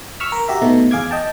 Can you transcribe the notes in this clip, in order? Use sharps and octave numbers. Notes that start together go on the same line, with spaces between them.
C#6 E6 F6 B6
A#4
F#4 G4 E5 A#5
B2 A3 D#4
E2 G#4 F5 D6 G#6
D#5 G5 A5